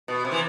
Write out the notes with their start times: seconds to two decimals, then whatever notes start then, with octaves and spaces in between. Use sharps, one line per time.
0.08 B2
0.25 C3
0.32 E3